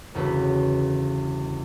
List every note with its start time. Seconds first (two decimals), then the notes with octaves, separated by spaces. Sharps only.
0.14 G1 E2 C#3 F#4 B4